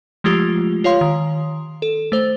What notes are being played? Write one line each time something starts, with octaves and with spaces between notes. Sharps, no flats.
F3 G#3 A3 F4 G4
F4 C#5 F5 C6
D#3
A4
A3 C5